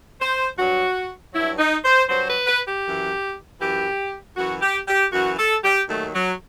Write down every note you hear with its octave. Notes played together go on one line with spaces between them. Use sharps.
C5
G2 F#3 F#4
G2 F#3 E4
D#4
C5
G2 F#3 C5
B4
B4
G4
F#2 E3
F#2 E3 G4
F#2 E3 F#4
G4
G4
F#2 E3 F#4
A4
G4
D#2 D#3 F#3 A3
F#3